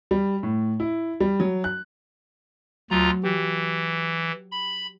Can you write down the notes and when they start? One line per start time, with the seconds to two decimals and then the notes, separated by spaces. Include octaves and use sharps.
0.11 G3
0.43 A2
0.80 E4
1.20 G3
1.40 F#3
1.64 F#6
2.90 D2 F#3 F4 A#5
3.23 E3 G4
4.52 B5